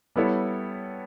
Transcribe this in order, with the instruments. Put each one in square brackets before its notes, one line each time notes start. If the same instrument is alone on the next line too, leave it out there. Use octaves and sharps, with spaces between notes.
[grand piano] G3 B3 E4 A4 C#5